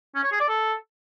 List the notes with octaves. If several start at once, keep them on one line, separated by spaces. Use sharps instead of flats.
C#4
C#5
G#4
D5
A4